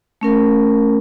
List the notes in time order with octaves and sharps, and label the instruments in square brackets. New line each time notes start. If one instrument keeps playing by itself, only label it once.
[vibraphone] A3 C#4 A#4